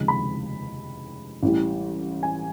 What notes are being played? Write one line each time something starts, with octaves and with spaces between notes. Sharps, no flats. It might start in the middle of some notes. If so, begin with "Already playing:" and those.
Already playing: F1 D#2 C#3 F3 G#3
B5
A1 A2 E3 G3
G#5